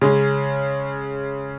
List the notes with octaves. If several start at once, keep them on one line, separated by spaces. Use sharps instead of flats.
C#3 G#3 C#4